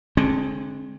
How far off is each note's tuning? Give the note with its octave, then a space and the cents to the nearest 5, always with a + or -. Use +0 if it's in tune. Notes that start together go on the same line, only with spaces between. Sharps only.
D3 +0 G#3 +15 C4 +40